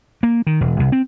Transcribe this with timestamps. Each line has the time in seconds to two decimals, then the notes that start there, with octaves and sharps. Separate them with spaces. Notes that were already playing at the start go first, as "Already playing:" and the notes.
0.23 A#3
0.47 D#3
0.61 E1
0.79 C2
0.92 C4